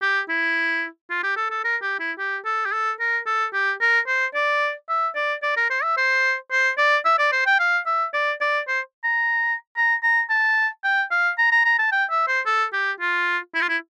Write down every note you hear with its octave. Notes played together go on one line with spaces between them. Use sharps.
G4
E4
F4
G4
A4
A4
A#4
G4
E4
G4
A4
G4
A4
A#4
A4
G4
A#4
C5
D5
E5
D5
D5
A#4
C5
E5
C5
C5
D5
E5
D5
C5
G5
F5
E5
D5
D5
C5
A#5
A#5
A#5
A5
G5
F5
A#5
A#5
A#5
A5
G5
E5
C5
A4
G4
F4
E4
F4
E4